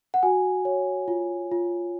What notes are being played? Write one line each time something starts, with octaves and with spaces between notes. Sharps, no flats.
F#5
F#4 G#5
C#5
F4
F4